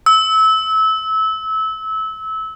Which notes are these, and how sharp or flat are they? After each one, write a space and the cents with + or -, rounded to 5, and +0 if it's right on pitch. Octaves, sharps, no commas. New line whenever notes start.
E6 -25